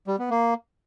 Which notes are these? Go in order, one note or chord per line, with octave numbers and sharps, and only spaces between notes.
G3
B3
A#3